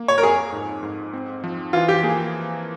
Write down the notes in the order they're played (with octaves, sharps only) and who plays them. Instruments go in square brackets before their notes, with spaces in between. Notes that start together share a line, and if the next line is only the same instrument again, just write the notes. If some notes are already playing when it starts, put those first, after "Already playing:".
Already playing: [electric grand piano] A#3
[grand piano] C#5
A#4
[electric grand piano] F2 [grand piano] G#4
[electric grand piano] G#2
G#2
C4
F3
[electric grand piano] E3 [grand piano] F4
[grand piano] G4
[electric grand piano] A#3 [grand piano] G#4